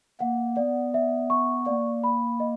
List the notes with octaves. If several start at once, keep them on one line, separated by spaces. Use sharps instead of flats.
A#3 F#5
B3 D5
E5
C#6
A#3 D5
B5
D#5